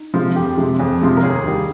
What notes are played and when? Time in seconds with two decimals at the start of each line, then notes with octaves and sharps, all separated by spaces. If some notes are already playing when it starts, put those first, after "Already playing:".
Already playing: D#4
0.14 C3 F3 G#3
0.36 F2 G4
0.57 C3 F3 G#3
0.79 F2
1.01 C3 F3 G#3
1.17 A#4
1.23 D#2 G#4
1.46 D#3 G3